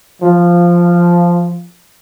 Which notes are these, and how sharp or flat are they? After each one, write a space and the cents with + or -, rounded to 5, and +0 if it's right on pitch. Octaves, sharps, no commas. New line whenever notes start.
F3 -5